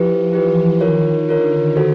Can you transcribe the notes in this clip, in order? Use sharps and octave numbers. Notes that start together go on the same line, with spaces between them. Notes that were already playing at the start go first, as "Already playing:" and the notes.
Already playing: F3 E4 G4 B4
E3 E4 G4 B4
D#3 F4 A#4 C#5
D3 F4 A#4 C#5
F#4 A4 C5